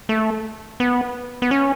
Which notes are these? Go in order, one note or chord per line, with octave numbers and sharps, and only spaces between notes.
A3
B3
B3
C#4